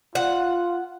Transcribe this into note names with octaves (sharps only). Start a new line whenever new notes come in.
F4 F#5